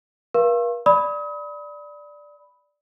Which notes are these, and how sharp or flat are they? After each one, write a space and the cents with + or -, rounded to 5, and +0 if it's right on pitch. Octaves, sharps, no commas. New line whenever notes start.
A#4 +45 F5 -30 C#6 -45
D5 +0 B5 +0 D#6 +40